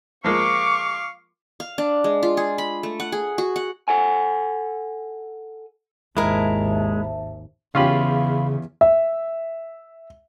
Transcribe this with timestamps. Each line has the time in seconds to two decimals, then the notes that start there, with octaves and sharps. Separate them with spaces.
0.24 F3 G#3 A#3 F5 C#6 D6
1.60 F5
1.78 D4
2.04 G#3
2.23 F4
2.37 G#4
2.58 B5
2.83 A3
3.00 F#5
3.12 G#4
3.38 F#4
3.56 F#5
3.88 A4 F#5 G#5
6.17 G#1 D#2 G#3 E4 A#4 C5 E5 A5
7.75 E2 C#3 C#4 F4 G4 F5 B5
8.81 E5